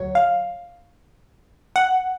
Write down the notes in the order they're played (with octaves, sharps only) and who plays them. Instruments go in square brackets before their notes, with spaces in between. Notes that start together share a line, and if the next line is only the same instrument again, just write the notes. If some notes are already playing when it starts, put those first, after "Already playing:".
Already playing: [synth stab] D2 F#3 C#5
F5
F#5